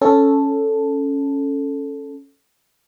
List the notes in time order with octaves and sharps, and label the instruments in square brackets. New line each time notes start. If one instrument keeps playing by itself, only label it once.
[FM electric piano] C#4 A4